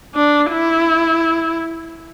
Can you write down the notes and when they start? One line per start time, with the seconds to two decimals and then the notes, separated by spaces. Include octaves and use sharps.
0.14 D4
0.51 E4